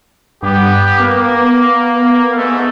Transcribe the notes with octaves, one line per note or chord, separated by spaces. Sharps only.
G2 B3 G4
A#3 B3
G#2 A3